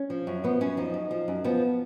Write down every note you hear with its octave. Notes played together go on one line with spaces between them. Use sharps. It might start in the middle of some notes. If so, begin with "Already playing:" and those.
Already playing: C#4
F3
F#2
F3 B3
F#2 C#4
F3 D#4
F#2
F3
F#2
F3 B3